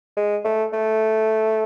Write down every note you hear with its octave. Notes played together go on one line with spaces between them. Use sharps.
G#3
A3
A3